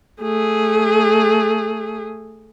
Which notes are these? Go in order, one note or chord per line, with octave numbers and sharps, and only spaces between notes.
A3 G#4